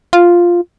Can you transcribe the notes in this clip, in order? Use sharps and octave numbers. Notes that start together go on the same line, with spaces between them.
F4